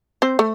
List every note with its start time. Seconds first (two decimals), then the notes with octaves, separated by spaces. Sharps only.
0.22 C4 C5
0.39 A3